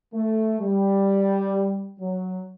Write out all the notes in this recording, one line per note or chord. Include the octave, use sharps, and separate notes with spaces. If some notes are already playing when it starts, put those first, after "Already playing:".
A3
G3
F#3